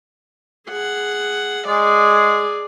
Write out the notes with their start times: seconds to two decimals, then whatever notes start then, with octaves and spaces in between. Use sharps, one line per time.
0.68 G#4 F#5
1.67 G#3 G#4 D5